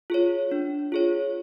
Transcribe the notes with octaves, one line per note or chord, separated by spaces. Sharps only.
F4 G#4 C#5
D4
F4 G#4 C#5